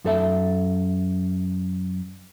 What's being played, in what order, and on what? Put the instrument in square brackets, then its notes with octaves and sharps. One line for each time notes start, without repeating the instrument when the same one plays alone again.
[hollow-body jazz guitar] F#2 A4 E5